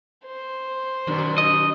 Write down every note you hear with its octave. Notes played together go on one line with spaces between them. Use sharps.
C5
F#2 B2 D#3
D#5